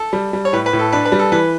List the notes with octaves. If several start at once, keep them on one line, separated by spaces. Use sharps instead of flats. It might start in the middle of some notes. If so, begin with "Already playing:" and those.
Already playing: A4
G3
G3
C#5
A2 B4
B4
A2
A4
D4 B4
B4
G3
A4
E3 B4